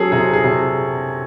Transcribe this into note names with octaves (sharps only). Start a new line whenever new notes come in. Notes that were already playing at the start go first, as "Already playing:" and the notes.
Already playing: F#3 C#4 G#4 A4
C3 G#4
G#4
C3